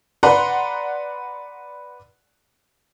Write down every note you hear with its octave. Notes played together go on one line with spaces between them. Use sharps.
B4 D5 F#5 A#5 C6